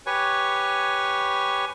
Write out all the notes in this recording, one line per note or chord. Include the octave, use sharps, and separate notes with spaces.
G4 B4 C#5 G#5 C#6